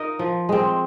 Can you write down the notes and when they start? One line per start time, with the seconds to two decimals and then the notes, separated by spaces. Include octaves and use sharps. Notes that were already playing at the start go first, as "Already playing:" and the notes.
Already playing: D#4 F4 A#4 D#5
0.19 F3
0.49 G#3 C4